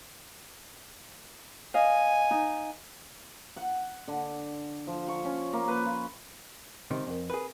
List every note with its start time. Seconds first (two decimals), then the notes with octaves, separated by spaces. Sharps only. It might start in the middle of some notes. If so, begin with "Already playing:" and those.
1.74 D#5 F5 G#5
2.31 D#4
3.56 F#5
4.08 D3
4.87 F3
5.08 C#6
5.25 C#4
5.53 A#3
5.68 B4
5.85 F4
6.90 C#2 C3 D#3 C5
7.07 F2 C4 A#4
7.30 G#4 A#4 B4 G#5